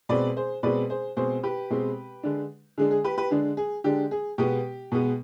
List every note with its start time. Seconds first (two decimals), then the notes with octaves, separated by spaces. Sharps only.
0.09 B2 G#3 C4 B4 D5
0.37 G#4 C5
0.63 B2 G#3 C4 B4 D5
0.90 G#4 C5
1.16 B2 G#3 C4 G#4 C5
1.43 G4 B4
1.70 B2 G#3 C4
2.23 D3 G#3 D4
2.78 D3 G#3 D4 G#4
2.91 G#4
3.04 G4 B4
3.18 G4 B4
3.31 D3 G#3 D4 G#4
3.57 G#4
3.84 D3 G#3 D4 G4
4.11 G#4
4.38 B2 G#3 B3 G4
4.92 B2 G#3 B3